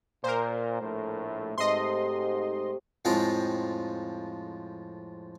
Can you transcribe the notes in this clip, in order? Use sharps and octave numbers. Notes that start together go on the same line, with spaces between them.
A#2 A#4 C5
A#1 A2 A3
G#2 C3 A3 D#5 C6
F2 A2 F3 G#3 G5 A#5